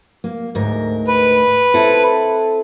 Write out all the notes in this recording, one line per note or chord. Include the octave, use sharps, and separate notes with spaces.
A#3
D2 G#2 A#4
B4
C4 E4 A4